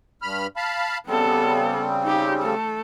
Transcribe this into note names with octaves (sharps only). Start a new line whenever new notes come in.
G2 B5 F6
F5 A5 B5
C#3 G3 B3 C4 A4
D#4 G4
A3 A4